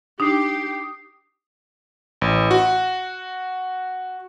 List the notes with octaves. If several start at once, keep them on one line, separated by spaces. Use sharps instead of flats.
D4 D#4 G4 D#6 C7
A1
F#4